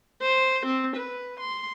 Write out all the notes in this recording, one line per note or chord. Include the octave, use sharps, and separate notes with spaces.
C5
C4
B4
C6